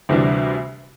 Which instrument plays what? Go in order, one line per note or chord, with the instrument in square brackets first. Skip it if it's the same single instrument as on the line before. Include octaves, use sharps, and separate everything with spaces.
[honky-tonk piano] D2 C3 E3 G3 D4